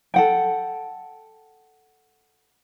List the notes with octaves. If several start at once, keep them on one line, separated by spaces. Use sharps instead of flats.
A4 F#5 G5